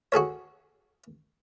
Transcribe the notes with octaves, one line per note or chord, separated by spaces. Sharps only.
F#4 G#4 A4 C#5